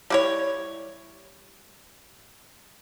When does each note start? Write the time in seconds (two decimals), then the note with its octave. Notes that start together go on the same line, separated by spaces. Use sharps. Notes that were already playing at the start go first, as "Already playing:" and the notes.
0.10 G3 E4 C#5